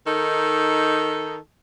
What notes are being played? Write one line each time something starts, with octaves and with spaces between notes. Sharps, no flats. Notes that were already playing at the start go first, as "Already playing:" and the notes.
D#3 D#4 A4